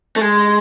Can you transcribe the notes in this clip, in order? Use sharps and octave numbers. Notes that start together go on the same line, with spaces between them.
A3
G#3